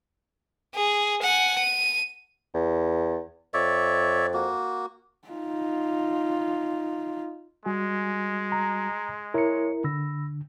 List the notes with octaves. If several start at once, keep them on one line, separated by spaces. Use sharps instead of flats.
G#4
F#5 G#5
D#7
E2
F2 C#5 D5 E5
A#3 F#4
D#4 F4
G3 G#3 F#4 G#5
A#5
E4 A#4 C#5 C#7
D3 B5 E6 A#6